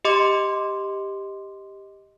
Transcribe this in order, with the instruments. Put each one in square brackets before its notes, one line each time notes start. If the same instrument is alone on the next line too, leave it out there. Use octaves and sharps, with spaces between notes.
[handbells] G4 D#5 C6 D6